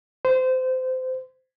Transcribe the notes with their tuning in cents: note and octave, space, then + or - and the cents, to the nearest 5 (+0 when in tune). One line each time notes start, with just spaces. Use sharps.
C5 -25